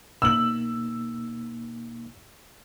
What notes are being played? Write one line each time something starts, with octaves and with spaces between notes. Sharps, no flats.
B2 A#3 D#4 E6 F#7